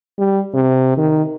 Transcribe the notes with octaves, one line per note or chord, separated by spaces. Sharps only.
G3
C3
D#3